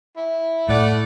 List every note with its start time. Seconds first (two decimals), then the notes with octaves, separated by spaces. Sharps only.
0.17 E4
0.69 A2 A3 D5 F#5